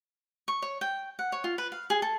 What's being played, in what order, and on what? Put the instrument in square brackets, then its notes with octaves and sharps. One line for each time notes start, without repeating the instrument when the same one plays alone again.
[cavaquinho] C#6
C#5
G5
F#5
C#5
F4
B4
F5
G#4
A4